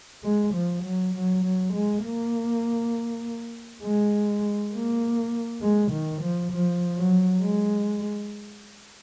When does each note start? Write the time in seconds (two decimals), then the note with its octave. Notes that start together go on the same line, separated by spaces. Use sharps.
0.23 G#3
0.54 F3
0.83 F#3
1.14 F#3
1.44 F#3
1.73 G#3
2.03 A#3
3.83 G#3
4.72 A#3
5.61 G#3
5.92 D#3
6.22 F3
6.52 F3
6.95 F#3
7.41 G#3